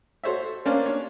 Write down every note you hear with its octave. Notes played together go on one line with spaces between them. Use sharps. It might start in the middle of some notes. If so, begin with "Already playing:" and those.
F#4 A4 C5 C#5 E5
A#3 C#4 D4 C5 D5 F5
D4 C#5